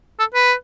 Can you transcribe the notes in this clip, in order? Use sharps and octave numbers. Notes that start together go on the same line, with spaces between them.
A4
B4